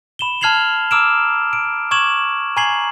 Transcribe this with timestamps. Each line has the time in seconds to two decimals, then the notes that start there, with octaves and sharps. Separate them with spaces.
0.19 B5 E7 G7
0.41 A5 F6 G#6 C7 F7 F#7
0.91 A#5 D6 E6 F6 D7 E7
1.53 D7
1.91 C#6 D6 G#6 E7 F#7
2.57 G#5 A#5 C#6 G#6 C7 F#7